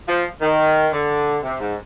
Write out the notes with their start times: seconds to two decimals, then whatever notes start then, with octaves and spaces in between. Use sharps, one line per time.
0.09 F3
0.41 D#3
0.92 D3
1.43 C3
1.60 G#2